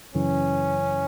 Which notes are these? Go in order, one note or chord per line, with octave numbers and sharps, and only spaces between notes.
F#2 C#3 E3 C#4